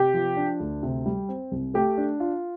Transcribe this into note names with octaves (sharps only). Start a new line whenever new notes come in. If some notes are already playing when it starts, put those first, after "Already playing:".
Already playing: C3 G4
F3
D4
D2
C3
G3
C4
C2
A3 G4
D4
F4